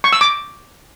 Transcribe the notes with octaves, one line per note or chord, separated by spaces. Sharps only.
C#6
E6
D6